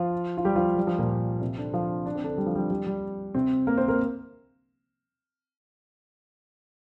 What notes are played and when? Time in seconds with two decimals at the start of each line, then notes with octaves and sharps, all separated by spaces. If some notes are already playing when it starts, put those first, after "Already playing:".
Already playing: F3 F4
0.37 F4
0.45 G3 G4
0.56 F3 F4
0.77 G3
0.87 F3
0.99 A#2 A#3
1.41 C3 C4
1.58 D3 D4
1.74 F3 F4
2.06 D4
2.15 C4
2.24 D3 D4
2.38 G3
2.46 F3
2.56 G3
2.71 G3
2.87 G3
3.35 C3 C4
3.67 A#3 A#4
3.77 C4 C5
3.88 A#3 A#4